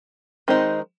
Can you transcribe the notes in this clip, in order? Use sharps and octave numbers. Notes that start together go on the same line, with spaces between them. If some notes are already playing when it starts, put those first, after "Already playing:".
D#3 G#3 C4 D#4